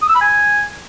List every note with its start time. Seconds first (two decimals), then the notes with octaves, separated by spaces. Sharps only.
0.02 D#6
0.09 E6
0.15 B5
0.22 G#5